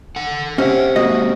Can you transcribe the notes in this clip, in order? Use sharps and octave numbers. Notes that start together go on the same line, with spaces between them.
A4 F#5
C3 C#4 D#5 E5 F#5
G#3 A#3 F#4 D#5